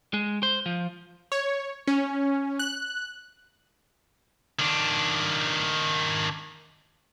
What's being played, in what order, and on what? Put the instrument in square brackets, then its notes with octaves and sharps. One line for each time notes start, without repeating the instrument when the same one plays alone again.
[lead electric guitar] G#3
C5
F3
[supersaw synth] C#5
C#4
F#6
[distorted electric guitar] D#3 D4